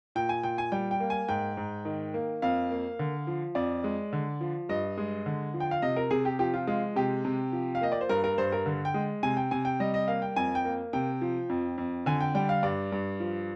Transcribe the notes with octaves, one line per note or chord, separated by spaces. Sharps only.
A#2 G5
G#5
A#2 G5
G#5
G3 G5
G5
A#3
G#5
G#2 G5
G#2
D#3
A#3
F2 F5
A#3
D3
F3
F2 D5
G#3
D3
F3
G2 D#5
G#3
D3
F3
G5
F5
C3 D#5
A#4
C3 G#4
G4
F3 G4
F4
G#3 F4
C3 G4
C3
F3
F5
A#3 D#5
D5
C5
G2 A#4
A#4
G2 C5
A#4
D3
G5
G#3
C3 G#5
G5
C3 G#5
G5
G3 D#5
D#5
A#3 F5
G5
F2 G#5
G5
A#3
C3 G5
F3
F2
F2
D3 G#5
G5
G3 G5
F5
G2 D5
G2
F3